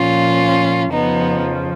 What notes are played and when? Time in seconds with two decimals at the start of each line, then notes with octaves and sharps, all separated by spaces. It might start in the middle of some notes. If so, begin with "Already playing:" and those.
Already playing: A#2 F3 C#4 F4
0.93 F2 C#3 F3 B3 D#4